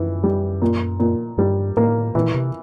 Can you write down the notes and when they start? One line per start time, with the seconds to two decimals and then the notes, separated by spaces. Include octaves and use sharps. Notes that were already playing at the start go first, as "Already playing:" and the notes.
Already playing: F#2 E3
0.24 G3
0.62 A#2
1.00 A#2
1.38 G2 G3
1.77 A2 A#3
2.15 A#2 E3
2.35 C3